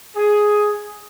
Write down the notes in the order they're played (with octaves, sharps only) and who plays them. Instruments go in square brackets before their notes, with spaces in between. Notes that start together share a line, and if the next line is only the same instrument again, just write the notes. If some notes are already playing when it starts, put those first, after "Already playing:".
[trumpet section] G#4